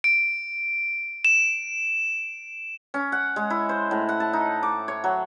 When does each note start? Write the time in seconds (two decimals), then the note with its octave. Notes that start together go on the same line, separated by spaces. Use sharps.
0.04 D7
1.25 E7
2.94 C#4
3.12 F#5
3.36 G#3
3.50 E4
3.69 C5
3.91 A2
4.09 F#5
4.20 A5
4.33 D#4
4.63 D6
4.88 C#5
5.04 F#3